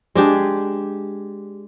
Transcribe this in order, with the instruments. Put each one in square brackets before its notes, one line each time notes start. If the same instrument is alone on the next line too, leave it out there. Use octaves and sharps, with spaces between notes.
[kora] G#3 D4 G4 G#4